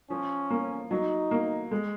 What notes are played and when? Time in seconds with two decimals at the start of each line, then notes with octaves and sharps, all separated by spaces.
0.10 F3 C#4
0.50 A#3
0.91 F#3 D#4
1.31 A#3
1.71 G#3